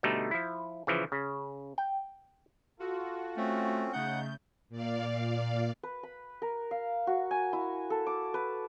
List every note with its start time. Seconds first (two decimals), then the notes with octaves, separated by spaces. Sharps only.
0.03 B2 D3 G3 A3 D#4
0.31 F3 E4
0.87 C#3 E3 F3
1.12 C#3
1.78 G5
2.80 F4 F#4 A4
3.37 A3 C4 C#4
3.93 C#3 A3 D#4 F#5 G6
4.69 A#2 D5 F5
5.83 B4
6.03 B5
6.42 A#4
6.71 F5
7.07 F#4
7.31 G#5
7.53 E4
7.90 A4
8.07 D6
8.34 B4